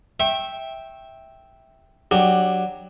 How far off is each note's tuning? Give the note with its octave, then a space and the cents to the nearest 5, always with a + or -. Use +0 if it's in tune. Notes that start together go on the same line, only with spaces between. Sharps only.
E5 -10 G5 +0 C#6 -35
F#3 +0 D4 +15 G4 +0